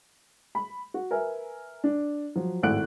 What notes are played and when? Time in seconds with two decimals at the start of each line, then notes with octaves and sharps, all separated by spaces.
0.55 B5
0.94 F#4
1.11 A#4 B4 E5 G#5
1.84 D4
2.35 F3 F#3
2.63 G#1 A2 A3 F#5 F#6 D7